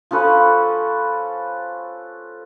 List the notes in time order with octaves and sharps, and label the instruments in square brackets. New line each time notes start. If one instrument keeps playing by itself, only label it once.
[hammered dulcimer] F3 C#4 A4 B4